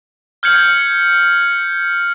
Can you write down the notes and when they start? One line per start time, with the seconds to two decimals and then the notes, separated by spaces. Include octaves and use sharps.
0.43 F6 G6 G#6 C#7 F#7